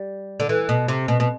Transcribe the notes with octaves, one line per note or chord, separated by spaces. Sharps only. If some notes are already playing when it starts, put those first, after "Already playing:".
Already playing: G3
D3
E3
B2
C3
B2
B2